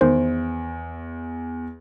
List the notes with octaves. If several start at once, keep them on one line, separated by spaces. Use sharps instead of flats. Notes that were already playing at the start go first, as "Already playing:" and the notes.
E2 D#3 C5